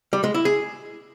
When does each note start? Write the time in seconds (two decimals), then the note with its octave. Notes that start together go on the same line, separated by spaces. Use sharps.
0.13 G3
0.24 G#3
0.34 E4
0.45 G#4